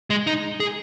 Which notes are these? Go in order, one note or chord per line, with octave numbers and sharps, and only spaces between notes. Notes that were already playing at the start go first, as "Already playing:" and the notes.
G#3
D#4
G#4